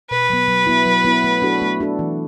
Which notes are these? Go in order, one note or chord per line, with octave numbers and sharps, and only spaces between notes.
B2 B4
F#3 B3
F#3
B3 E4
F#3
B3 E4
A3
D4 F#4 A4
A3
D4 F#4 A4
E3